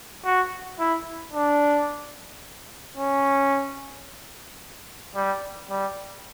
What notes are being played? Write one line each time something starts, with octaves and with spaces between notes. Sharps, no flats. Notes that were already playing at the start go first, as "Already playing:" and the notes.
F#4
E4
D4
C#4
G3
G3